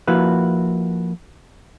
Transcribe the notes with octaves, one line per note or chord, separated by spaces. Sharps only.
F3 A#3 E4 F#4 B4